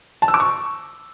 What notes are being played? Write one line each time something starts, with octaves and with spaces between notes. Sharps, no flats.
A5
E6
D6
C#6